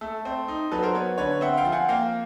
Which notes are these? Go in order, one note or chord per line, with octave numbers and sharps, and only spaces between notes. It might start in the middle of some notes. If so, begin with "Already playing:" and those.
A3 A4
C4
D#4
F#3 A4 B4
A#4 C5
B3 B4 C#5
D3 B4 C#5
C4 E5 F#5
F5 G5
F3
F#5 G#5
A#3 F5 G5